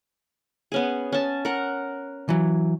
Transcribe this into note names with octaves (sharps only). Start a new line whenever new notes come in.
B3 C#4 G#4
C#4 A5
A#4 F#5
E3 F#3